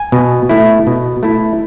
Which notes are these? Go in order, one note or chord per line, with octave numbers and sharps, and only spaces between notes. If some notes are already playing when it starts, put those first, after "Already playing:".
Already playing: G#5
B2
A3 E4
B2
A3 E4